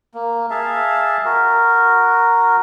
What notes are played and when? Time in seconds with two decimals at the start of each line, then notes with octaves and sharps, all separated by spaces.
0.14 A#3
0.50 G#4 E5 F5 A5
1.25 F#4 A#4